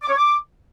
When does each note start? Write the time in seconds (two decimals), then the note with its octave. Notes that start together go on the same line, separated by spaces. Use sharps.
0.02 D6
0.09 C#5
0.17 D6